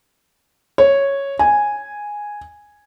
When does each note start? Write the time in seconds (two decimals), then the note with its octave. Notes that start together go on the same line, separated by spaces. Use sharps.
0.78 C#5
1.39 G#5